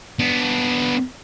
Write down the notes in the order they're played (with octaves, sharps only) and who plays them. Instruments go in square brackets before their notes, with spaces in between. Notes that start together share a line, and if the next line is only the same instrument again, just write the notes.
[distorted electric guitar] B3 D4